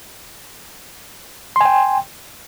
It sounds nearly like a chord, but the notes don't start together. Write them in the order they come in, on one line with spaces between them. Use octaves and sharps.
C6 G#5 G5